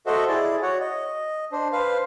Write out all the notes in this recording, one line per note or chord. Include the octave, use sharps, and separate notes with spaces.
F#4 A4 C5 D#5 E5 F#5
E4 G#4 D5
F#4 C#5 F#5
D#5
D4 C5
B4 C5 F5